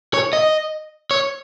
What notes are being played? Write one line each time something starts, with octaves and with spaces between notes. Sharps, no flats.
C#5
D#5
C#5